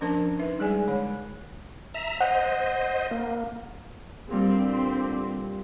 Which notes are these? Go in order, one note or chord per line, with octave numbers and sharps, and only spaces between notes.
F3 C#4 D4 A#4 C5 A5
D#4 B4 E5
G3 G#3 G#4 D5 G#5
D3 G#3 C#5
E5 A#5
C5 D#5 F#5
A#3
A#2 D3 G3 C4 D4 G4